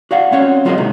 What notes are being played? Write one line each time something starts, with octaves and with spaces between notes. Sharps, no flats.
F#4 D5 F5 F#5
C4 C#4 F#4 C#5 F#5
F#3 F4 F#4 G#4 A#4 D#5
A2 C3 D#3 G#3 A3